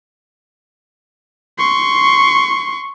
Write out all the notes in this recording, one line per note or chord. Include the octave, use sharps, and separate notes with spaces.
C6 C#6